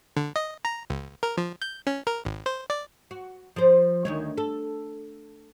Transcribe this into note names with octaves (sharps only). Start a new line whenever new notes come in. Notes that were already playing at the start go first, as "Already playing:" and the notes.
D3
D#5
A#5
C#2
A#4
F3
G6
C#4
A#4
G#1
C5
D5
F#4
F3 C5
D2 D#3 C#5
A4